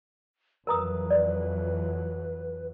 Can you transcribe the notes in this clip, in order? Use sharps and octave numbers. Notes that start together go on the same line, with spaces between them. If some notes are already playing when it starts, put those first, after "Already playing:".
F2 E3 F#3 A#4 B4 A#5 D#6
D5